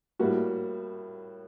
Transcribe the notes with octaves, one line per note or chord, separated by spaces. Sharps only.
A2 G3 A#3 F#4